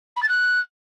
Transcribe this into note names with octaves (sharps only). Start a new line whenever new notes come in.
B5
A6
F#6